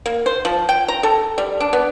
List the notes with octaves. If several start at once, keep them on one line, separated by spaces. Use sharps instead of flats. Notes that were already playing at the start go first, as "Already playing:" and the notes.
A#3
C5
F3
G5
A#5
A4
G3
D4
B3